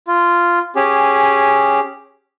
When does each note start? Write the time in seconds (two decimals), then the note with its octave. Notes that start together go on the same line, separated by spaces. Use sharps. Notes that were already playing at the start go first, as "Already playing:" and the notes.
0.07 F4
0.76 C#4 G4 G#4